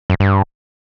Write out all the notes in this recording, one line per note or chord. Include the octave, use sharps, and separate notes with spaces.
F#2
G2